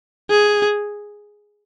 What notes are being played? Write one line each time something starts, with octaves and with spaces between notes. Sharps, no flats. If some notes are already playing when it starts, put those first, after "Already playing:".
G#4